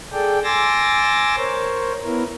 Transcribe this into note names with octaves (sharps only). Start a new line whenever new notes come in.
G#4 A4 D5 G5
G#5 C6 D6 E6 A6 A#6
A#4 C5 C#5
B3 E4 A#4